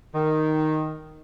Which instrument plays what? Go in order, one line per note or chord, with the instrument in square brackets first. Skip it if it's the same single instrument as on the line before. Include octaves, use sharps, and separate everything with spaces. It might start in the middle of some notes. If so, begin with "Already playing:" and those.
[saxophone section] D#3